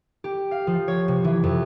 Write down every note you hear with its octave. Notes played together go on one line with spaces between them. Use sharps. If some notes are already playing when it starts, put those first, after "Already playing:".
G4
F5
F3
C#5
C3
E3
F2